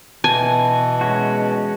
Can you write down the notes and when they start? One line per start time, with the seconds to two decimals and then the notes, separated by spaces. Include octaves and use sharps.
0.24 B2 E3 G#5 A5
1.01 G#3 C#4 F#4